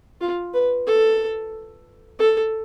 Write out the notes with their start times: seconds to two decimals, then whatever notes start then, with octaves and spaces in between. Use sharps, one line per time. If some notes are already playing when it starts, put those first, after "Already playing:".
0.21 F4
0.54 B4
0.87 A4
2.19 A4